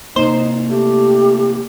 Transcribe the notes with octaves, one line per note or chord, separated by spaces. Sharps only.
C3 A#3 D#4 C5
A3 G4